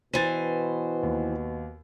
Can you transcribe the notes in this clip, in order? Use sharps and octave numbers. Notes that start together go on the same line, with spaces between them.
B2 E3 C5 A6 D#7
D#2